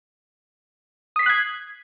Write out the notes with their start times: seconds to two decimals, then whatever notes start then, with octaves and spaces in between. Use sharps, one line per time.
1.16 D#6
1.19 B6
1.23 C7
1.26 F#6
1.29 G#6